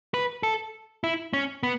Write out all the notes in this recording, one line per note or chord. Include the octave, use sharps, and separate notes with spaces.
B4
A4
E4
C#4
B3